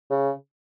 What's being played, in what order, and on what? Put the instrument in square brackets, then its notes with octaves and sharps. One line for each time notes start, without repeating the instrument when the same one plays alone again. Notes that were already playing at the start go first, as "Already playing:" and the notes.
[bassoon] C#3